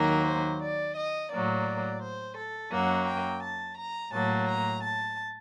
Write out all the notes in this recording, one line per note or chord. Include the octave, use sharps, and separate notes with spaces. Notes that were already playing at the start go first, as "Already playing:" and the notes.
Already playing: D#2 D#3 F#3 A#3 A#4
C5
D5
D#5
A2 F#3 A#3 D5
C5
A4
F#2 F#3 A#3 F#5
G5
A5
A#5
A2 F#3 A#3 A5
A#5
A5